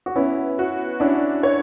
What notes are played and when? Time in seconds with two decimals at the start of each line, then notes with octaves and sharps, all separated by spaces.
0.06 F#4
0.16 B3 C#4 E4
0.59 F#4
1.00 C#4 D4 E4
1.43 C#5